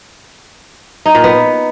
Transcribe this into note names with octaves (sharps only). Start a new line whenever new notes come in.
D#4
A#2
B3